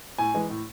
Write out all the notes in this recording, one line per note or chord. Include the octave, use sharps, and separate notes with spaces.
A2 G#5
E3 G#3
A2